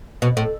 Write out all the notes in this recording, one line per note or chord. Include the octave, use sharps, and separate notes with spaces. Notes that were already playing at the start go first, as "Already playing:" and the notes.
B2
A2